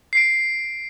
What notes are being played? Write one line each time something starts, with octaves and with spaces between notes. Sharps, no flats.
C7 D7